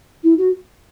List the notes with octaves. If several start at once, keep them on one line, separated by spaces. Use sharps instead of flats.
E4
F#4